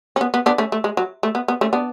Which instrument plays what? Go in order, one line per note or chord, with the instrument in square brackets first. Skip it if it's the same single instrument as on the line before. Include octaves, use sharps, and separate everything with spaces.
[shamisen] C#4
B3
B3
B3 D4
A3 C#4
A3
G#3
F#3
A3
B3
B3
A3 C#4
B3 D4